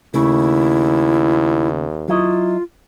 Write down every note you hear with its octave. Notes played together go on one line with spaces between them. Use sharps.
D#2 C#3 A3 E4
F#3 E4 F4 D#5